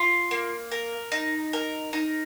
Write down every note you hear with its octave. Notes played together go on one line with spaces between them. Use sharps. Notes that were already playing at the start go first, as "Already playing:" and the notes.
Already playing: F4
A#3
A#4
D#4
A#4
D#4